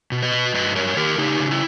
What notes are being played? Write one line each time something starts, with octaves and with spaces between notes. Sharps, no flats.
B2
B4 D#5
B2
G2 B4 D#5
G2 A#4 C#5
D#3 G4 A#4
C#3 D#4 G4
C#3
E4